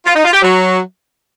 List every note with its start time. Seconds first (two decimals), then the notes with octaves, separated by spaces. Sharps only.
0.05 F4
0.14 D#4
0.24 F4
0.33 G4
0.42 F#3